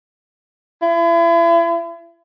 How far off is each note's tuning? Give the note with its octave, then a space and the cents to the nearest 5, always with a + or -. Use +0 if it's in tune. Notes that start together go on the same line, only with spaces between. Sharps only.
E4 +40